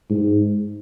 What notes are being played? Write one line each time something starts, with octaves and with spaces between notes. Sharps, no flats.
G#2